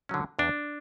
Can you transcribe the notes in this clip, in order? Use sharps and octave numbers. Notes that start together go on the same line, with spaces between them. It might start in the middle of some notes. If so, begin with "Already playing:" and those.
D3 F#3 C#4
E2 D4